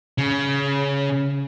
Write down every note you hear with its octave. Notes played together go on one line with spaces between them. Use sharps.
C#3